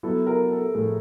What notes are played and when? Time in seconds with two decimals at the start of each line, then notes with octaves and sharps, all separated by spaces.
0.03 F#3 B3 E4 A4
0.27 A#4
0.51 A4
0.74 A2 F3 A3 G#4